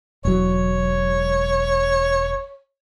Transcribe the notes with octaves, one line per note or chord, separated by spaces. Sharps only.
E1 F#3 C#5